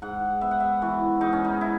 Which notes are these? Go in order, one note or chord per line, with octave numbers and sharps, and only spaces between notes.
G#2 F#5
B3 E5
F#5
E5
E3 F#4
G#2 D#4
C#4
D#4
E4